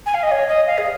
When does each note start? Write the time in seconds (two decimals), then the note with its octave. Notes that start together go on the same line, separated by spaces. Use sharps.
0.06 G#5
0.14 F5
0.23 D#5
0.31 C#5
0.48 D#5
0.66 F5
0.77 G#4